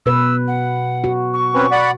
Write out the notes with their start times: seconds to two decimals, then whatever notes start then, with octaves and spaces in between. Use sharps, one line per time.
0.06 B2 B4 E6
0.48 F#5
1.04 F#4
1.34 C#6
1.54 C4 C#4 B4
1.72 D5 F#5 B5